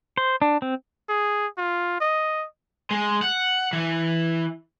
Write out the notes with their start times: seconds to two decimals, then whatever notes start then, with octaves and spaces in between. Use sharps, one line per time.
0.17 C5
0.42 D4
0.62 C4
1.09 G#4
1.58 F4
2.01 D#5
2.91 G#3
3.22 F#5
3.73 E3